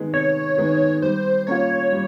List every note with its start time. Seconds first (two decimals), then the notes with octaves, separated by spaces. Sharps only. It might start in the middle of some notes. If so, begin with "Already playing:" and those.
Already playing: D#3 G#3 B3 D#4
0.13 C3 C#5
0.57 D#3 G#3 B3 D#4
1.02 G3 C5
1.47 A#3 C#4 F4 C#5
1.92 G3